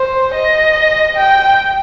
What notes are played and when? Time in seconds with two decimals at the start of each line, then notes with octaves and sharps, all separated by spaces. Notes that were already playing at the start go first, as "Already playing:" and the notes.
Already playing: C5
0.34 D#5
1.16 G5